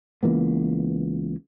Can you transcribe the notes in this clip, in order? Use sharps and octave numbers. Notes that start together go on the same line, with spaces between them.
C#2 E3 A#3 B3